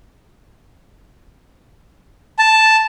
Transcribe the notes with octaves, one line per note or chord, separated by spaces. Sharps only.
A5